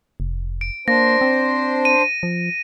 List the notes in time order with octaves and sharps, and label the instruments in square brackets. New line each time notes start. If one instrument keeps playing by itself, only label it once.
[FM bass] F1
[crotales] D7
[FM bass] A#3 [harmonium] D4 C5 [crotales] A#6
[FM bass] C4
[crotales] D#7
[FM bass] F3